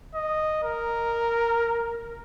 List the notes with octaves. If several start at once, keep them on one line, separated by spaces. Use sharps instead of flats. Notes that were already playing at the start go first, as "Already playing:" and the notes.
D#5
A#4